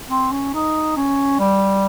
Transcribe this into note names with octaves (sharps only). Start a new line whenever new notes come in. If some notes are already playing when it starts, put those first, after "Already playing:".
C4
C#4
D#4
C#4
G3